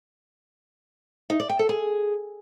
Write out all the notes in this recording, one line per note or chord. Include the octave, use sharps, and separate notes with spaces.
D#4
D5
G5
A4
G#4